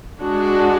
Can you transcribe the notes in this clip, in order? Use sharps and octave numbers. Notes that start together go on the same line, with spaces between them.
G#3 D4 F#4